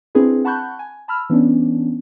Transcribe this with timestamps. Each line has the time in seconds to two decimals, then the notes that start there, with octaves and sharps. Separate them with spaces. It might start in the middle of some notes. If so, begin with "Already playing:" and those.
0.15 C4 D4 E4 G#4 B4
0.45 F#5 A5 B5 C#6 F#6 G6
0.79 G#5
1.08 A5 B5 E6 F6
1.30 E3 B3 C#4 D4